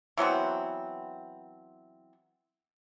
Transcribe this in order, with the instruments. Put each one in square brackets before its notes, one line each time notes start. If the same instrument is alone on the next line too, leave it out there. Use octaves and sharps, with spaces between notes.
[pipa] E3 F#3 B3 C4